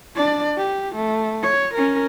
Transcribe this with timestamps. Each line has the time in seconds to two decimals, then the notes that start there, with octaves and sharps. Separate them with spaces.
0.16 D4 D5
0.58 G4
0.96 A3
1.43 C#5
1.74 C#4 A#4